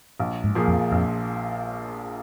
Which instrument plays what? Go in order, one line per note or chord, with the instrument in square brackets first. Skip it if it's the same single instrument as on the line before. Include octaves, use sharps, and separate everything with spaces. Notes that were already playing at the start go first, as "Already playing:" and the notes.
[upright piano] A#1
[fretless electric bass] G#2
[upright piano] A#2 F3 A#3 G#4
[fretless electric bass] F2
[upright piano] A#1 [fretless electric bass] F2